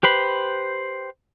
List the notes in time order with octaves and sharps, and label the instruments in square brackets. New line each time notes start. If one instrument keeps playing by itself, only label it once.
[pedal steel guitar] G4 B4 C5 B5